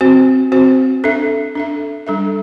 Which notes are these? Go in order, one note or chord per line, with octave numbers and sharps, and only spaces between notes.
C4 F#4 C5
C4 F#4 C5
D4 A4 E5
D4 A4 E5
G3 D4 A4 E5